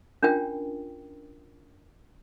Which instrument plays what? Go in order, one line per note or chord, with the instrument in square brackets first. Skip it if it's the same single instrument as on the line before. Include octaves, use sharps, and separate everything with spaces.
[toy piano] C#4 D4 F4 A#4 G5